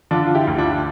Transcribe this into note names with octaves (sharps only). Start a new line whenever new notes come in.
D3 D4 F4
F4
E4 G4
D2
D4 F4